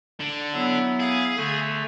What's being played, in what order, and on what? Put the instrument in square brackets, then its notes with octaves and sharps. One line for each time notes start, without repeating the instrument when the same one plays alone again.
[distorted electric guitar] D3
[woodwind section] F#3 B3 E4
[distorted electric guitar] G#4 [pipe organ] F5 G#6
[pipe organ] D3 A3